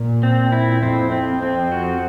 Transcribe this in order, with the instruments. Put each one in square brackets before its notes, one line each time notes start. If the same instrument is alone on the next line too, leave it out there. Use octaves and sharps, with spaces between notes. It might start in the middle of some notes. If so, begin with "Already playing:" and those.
Already playing: [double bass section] A#2
[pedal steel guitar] C4
E4
[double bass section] F2 [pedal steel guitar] C4
[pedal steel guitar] C4
C4
F#4